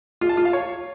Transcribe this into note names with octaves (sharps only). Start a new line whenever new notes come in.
F4
A5
F4
F5
C#5